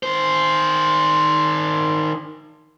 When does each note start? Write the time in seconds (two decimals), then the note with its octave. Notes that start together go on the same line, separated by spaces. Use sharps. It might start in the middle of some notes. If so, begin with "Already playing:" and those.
0.03 D#3 C5